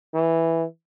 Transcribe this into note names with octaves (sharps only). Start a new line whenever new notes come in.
E3